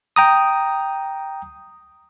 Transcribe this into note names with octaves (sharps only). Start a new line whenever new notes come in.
G5 A#5 D#6